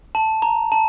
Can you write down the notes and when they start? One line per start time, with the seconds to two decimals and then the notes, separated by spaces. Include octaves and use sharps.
0.15 A5
0.42 A#5
0.72 A5